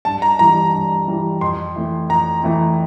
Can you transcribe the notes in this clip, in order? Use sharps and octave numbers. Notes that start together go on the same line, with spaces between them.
G2 A5
A#5
E3 G3 A#5
G2
E3 G3
F2 C6
E3 A3 C4
F2 A#5
E3 A3 C4